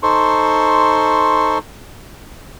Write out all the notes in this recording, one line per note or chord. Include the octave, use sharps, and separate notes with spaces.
D#4 A4 C5 C6 C#6